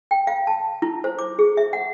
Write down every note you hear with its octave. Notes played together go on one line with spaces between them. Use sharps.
G5
F5
A5
E4
C5
D6
G#4
E5
F#5